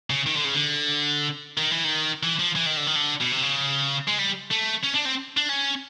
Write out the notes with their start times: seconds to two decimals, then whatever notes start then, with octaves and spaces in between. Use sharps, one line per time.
0.10 C#3
0.26 D#3
0.36 D3
0.45 C#3
0.54 D3
1.58 D#3
1.71 E3
1.84 D#3
2.23 E3
2.39 F3
2.55 E3
2.66 D#3
2.77 D3
2.86 D#3
2.95 D3
3.21 B2
3.32 C3
3.42 C#3
4.08 G#3
4.19 G3
4.51 A3
4.84 C#4
4.95 D4
5.06 C4
5.37 D4
5.49 C#4